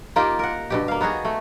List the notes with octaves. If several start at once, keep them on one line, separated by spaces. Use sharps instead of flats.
A#3 D#4 F4 G4
A#4 F#5
G2 B2 G4
A#3 F5
B3 D#4 F#4 G#4
A3